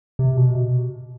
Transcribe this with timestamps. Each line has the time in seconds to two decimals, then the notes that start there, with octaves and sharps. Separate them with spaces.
0.19 C3
0.37 B2